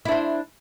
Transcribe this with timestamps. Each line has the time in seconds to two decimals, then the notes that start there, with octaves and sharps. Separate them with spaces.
0.05 E4
0.08 D4
0.12 C5